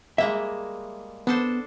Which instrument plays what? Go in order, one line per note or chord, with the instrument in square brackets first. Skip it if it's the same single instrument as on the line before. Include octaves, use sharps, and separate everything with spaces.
[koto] G3 G#3 A#3 [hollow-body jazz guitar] E5
[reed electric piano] B3 [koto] D4 A4 C5